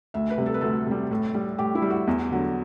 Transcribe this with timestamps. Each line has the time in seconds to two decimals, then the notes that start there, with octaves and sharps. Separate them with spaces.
0.14 D2 E5
0.30 B4
0.38 C3 G3
0.46 A4
0.54 B4
0.61 D2 A4
0.86 C3 G3
1.11 A2
1.34 G3
1.58 A2 G4
1.75 E4
1.82 G3
1.90 F#4
2.07 E2
2.31 D3 F#3